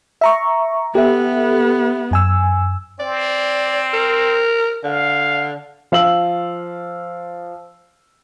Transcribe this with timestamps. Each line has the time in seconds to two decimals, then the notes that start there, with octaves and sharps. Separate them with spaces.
0.21 E5 A#5 C#6
0.95 B3 G4 A4 E5
2.11 F#2 G#5 E6
3.00 C4 D5
3.93 A#4
4.83 D3 F5
5.92 F3 F5 E6 F#7